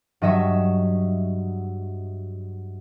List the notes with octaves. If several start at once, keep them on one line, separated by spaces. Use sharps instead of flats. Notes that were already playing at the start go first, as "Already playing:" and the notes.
G2 F#3 D#5 E5 C#6 E7